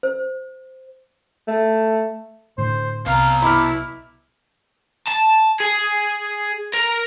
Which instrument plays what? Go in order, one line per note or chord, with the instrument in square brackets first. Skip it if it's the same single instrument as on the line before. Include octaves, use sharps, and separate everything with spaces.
[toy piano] C5
[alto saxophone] A3
[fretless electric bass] A2 D3 [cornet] C5
[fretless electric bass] C2 [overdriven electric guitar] B2 A#5 [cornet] F5
[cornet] E4 [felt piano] B5 D6 F6
[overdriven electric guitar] A5
G#4
A#4